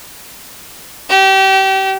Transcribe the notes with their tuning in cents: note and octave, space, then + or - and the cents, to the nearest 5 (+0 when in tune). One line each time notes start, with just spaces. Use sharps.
G4 -30